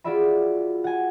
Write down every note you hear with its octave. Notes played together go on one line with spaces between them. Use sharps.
F4 F#4 G#4 D5 E5 B5
F#5 G#5